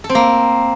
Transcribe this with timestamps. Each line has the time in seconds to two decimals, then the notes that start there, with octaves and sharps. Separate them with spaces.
0.04 A4
0.09 C4
0.15 A#3